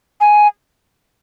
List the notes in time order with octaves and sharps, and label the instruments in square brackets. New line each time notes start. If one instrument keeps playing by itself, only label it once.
[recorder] G#5